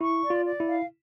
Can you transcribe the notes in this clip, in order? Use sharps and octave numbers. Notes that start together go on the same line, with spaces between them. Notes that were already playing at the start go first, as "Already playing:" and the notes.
E4 C#6
D5
F4
D5
E4
F5